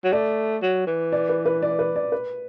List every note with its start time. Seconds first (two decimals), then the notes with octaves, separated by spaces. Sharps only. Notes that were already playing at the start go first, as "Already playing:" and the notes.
0.04 F#3
0.12 A3 D5
0.63 F#3
0.87 E3
1.12 D5
1.29 B4
1.46 B4
1.62 D5
1.79 B4
1.96 D5
2.12 B4